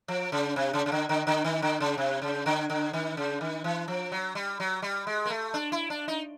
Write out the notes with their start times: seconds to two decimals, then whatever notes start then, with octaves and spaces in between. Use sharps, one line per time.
0.08 F3
0.32 C#3
0.56 C3
0.73 C#3
0.86 C#3
0.92 D3
1.09 D3
1.27 D3
1.44 D#3
1.62 D3
1.80 C#3
1.98 C3
2.22 C#3
2.46 D3
2.70 D3
2.93 D#3
3.17 C#3
3.41 D#3
3.64 E3
3.88 F3
4.12 F#3
4.35 G3
4.60 F#3
4.82 G3
5.07 G#3
5.26 A#3
5.30 A3
5.54 D4
5.72 E4
5.90 D4
6.08 D#4